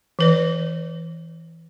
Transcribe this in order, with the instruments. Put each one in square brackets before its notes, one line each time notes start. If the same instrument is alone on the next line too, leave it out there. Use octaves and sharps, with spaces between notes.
[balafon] E3 B4 D5